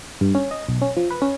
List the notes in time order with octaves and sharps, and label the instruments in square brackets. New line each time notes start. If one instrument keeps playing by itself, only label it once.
[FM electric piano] G2
C#4
D#5
B1
C#4
F3
B4
C#4